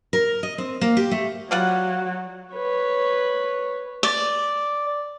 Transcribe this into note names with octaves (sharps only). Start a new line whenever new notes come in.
A#4
D#5
C4
A#3
G4
A3
F#3 G3 F4 F#5
B4 C#5
D5